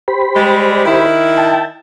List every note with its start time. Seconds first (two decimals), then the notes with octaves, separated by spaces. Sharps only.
0.08 G4 C5 B5
0.36 G3 G#3
0.85 D#3 E4
1.37 G5 A5